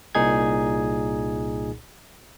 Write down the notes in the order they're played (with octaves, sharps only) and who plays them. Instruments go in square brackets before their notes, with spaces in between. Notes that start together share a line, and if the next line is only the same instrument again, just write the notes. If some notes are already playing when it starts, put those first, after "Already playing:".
[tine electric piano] C2 A#2 D#4 G#4 G#6